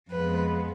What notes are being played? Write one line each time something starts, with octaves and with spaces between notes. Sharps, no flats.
F2 F3 G#3 B3 B4